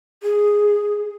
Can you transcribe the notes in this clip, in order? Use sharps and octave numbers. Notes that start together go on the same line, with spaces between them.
G#4